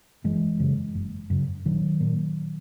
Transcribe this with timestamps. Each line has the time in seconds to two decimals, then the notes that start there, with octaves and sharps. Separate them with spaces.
0.24 F#1 E3 G#3
0.60 F#2 C#3
0.95 F#1
1.30 F#2 C#3
1.65 A#1 D#3 F#3
2.00 A#2